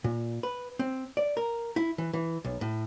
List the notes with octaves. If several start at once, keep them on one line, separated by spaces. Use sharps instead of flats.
A#2
B4
C4
D5
A#4
E4
E3
E3
B1
A2